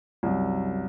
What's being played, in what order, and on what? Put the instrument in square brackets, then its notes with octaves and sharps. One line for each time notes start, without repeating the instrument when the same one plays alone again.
[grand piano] C2 F#2